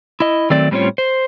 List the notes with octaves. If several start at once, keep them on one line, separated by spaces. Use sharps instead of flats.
E4 D#5
D#3 F#3 A3 C4 D5
A2 G3 C4 C#4 F4 C#5
C5